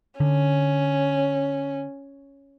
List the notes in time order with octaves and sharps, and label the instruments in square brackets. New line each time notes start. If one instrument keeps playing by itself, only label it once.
[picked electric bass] D3 [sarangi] C#4